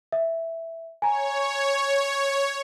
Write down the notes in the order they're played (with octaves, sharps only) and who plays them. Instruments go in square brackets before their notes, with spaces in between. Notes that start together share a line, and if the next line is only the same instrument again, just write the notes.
[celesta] E5
[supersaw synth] C#5 [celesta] G#5 A#5